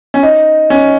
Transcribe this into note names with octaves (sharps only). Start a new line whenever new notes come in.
C#4
D#4
C#4